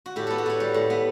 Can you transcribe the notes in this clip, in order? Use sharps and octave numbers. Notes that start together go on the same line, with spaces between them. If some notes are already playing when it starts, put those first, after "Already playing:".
F#4
A2 G4
B3 A4
F#4
A2 C#5
G3
A2
B3